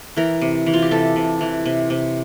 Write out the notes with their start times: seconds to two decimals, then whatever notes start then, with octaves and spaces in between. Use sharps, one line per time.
0.17 E3 A#4
0.41 C3
0.66 E3
0.74 F4
0.82 G4
0.91 C3 A4
1.16 C3
1.41 E3
1.66 C3
1.90 C3